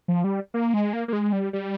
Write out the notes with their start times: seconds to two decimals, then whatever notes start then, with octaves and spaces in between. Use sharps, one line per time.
0.08 F3
0.24 G3
0.54 A#3
0.74 G#3
0.93 A#3
1.08 A#3
1.13 G#3
1.33 G3
1.53 G3